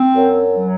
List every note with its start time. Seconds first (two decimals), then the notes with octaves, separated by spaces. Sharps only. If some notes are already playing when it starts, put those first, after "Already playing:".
Already playing: C4
0.16 F#2
0.56 F#3